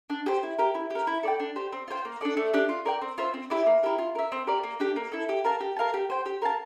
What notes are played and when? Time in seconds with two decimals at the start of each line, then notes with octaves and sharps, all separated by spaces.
0.10 D4
0.26 G4 C5
0.43 E4
0.58 G4 A#4
0.75 E4
0.90 G4 A#4
1.07 E4
1.23 A4 D5 G5
1.40 D4
1.56 G4 C5
1.72 C4
1.88 F4 C5 G5
2.05 A#3
2.21 D4 A4 D5
2.37 A3
2.54 D4 G4 D5
2.69 F4
2.85 A#4 D5 G5
3.02 C4
3.18 F4 C5 E5
3.34 C4
3.50 E4 G4 D5
3.66 A#3
3.83 E4 G4 A#4
3.98 F4
4.15 A#4 E5
4.32 C4
4.47 G4 A#4 D5
4.63 A#3
4.80 D4 G4
4.96 A#3
5.12 E4 A4
5.29 G4
5.44 A#4 F5 A5
5.61 G4
5.77 A#4 F5 A5
5.94 G4
6.10 C5 G5
6.26 G4
6.42 A#4 F5 A5